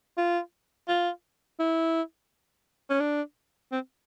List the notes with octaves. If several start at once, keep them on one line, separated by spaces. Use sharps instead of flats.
F4
F4
E4
C#4
D4
C4